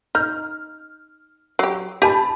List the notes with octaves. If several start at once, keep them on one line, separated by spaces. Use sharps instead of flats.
D#4 F6
F#3 G4
G4 G#5 A5 B5